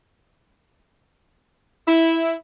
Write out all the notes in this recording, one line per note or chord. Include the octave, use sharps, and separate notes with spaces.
E4